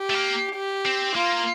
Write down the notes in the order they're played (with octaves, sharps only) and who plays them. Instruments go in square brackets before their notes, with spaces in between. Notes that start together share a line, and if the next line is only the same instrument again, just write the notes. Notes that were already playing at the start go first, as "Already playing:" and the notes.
Already playing: [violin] G4
[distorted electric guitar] A3
A#3
[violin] G4
[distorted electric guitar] C4
[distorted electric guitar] A#3 [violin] F4